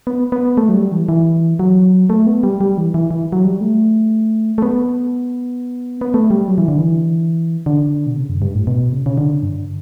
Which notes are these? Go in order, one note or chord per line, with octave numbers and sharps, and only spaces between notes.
B3
B3
A3
F#3
G3
E3
E3
F#3
A3
B3
G3
G3
E3
E3
E3
F#3
G3
A3
A3
B3
B3
A3
G3
F#3
E3
D3
E3
D3
B2
C#3
F#2
G2
A2
B2
C#3
C#3
D3
G2